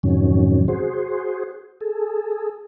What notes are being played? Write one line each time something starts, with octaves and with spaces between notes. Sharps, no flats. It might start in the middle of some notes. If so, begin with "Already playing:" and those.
F2 G#2 C3 D#3 F#3 C#4
F#4 G#4 C5
G#4 A4